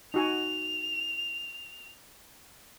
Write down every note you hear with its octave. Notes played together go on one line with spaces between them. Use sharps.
D#4 F#4 G#5 F7